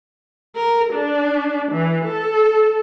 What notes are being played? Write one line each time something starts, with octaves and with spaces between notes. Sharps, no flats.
A#4
D4
E3
A4